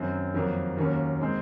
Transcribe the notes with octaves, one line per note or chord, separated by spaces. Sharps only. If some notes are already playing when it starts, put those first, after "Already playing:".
Already playing: F#2 D#3 F#3 C4
F2 D#3 F#3 A#3
D#2 D#3 F#3 A#3 C#4
D#3 G#3 C4